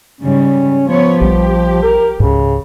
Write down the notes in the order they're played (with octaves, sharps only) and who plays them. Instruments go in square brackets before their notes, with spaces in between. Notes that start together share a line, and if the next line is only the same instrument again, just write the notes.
[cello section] G#2 C#3 G3 [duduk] C#4
[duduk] F3 [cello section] B3 C#5
[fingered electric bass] A#1 G3 [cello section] G4
[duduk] A#4
[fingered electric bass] C#2 G#2 [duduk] C#3